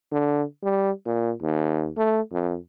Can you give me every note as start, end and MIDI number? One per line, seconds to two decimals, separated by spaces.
0.12 0.43 50
0.63 0.91 55
1.05 1.32 46
1.42 1.90 39
1.97 2.21 57
2.32 2.56 41